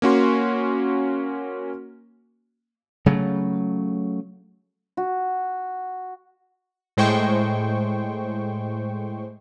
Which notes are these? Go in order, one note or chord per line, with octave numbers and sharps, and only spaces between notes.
A#3 C#4 F#4 C6
C#3 F#3 A3
F#4
A2 G#3 C5 G5 C#6